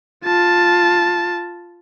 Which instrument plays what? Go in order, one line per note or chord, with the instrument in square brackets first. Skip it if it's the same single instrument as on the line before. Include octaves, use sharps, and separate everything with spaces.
[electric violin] F4 A5